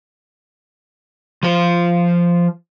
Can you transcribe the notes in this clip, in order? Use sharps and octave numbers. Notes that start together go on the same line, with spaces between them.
F3 C5